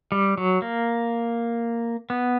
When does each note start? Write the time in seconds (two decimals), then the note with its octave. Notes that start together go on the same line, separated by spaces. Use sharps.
0.12 G3
0.38 F#3
0.62 A#3
2.10 B3